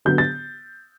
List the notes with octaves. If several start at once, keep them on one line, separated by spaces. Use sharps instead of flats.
D3 F#3 B3 G6
A6